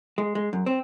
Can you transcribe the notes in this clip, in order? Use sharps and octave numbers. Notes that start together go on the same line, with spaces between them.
G#3
G#3
F#2
C4